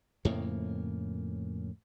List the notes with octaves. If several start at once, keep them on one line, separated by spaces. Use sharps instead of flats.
F2 A2 C#3 A#3